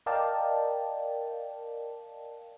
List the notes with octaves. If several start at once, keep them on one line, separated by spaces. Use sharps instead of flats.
A#4 D5 D#5 F5 G5 A5